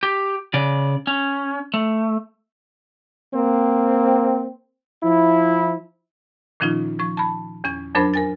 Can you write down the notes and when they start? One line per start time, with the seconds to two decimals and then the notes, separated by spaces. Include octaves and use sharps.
0.03 G4
0.54 C#3 D5
1.07 C#4
1.74 A3
3.34 A#3 C4
5.03 F3 E4
6.60 A#2 D#3 F3 C#4 D#4 F4
6.99 F3 C#6
7.17 A5 B5
7.64 E2 C#4 G#6
7.95 F2 F#3 D4 A#4 C5 B5
8.14 A#4 G#5 A6